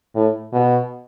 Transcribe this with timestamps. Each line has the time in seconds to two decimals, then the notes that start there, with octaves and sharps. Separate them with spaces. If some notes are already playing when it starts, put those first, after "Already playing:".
0.15 A2
0.53 B2